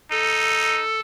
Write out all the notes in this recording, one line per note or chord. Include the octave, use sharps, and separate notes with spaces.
D#4 A4